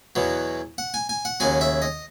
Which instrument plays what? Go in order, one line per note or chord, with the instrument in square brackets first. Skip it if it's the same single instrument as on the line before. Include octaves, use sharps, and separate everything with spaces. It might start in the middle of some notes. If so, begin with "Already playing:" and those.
[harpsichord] E2 B2 F#3
F#5
G#5
G#5
F#5
D#2 C#3 F#3 G#5
E5
D#5